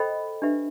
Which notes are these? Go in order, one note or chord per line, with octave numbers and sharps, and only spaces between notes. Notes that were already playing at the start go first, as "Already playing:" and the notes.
Already playing: A4 C5 D#5 G5 B5
D4 G4 B4 E5